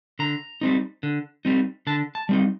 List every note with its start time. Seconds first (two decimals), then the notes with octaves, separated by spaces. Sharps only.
0.19 D3 A#5
0.61 G3 C4 D#4
1.03 D3
1.45 G3 C4 D#4
1.87 D3 A5
2.15 A5
2.29 G3 C4 D#4